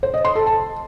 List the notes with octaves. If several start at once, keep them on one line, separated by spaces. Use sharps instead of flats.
C5
D#5
C6
A4
A5